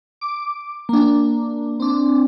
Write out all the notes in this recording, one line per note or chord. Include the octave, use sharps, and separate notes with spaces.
D6
A#3 D4
C4 D4